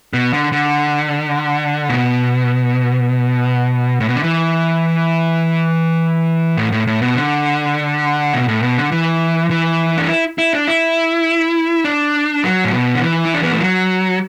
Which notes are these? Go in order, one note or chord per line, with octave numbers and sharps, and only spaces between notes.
B2
D3
D3
B2
A2
B2
D3
E3
A2
A2
A2
B2
D3
B2
A2
B2
D3
E3
E3
D4
E4
E4
D4
E4
D4
F#3
A2
B2
D3
E3
E4
D4
B3
A3
F#3